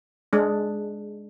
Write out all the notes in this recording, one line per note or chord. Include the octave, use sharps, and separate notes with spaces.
G#3 D4